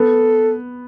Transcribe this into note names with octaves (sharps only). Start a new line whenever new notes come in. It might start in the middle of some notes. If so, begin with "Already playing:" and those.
Already playing: B3 A4